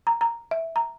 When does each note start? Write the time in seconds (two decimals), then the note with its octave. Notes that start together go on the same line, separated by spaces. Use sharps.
0.07 A#5
0.21 A#5
0.51 E5
0.76 A#5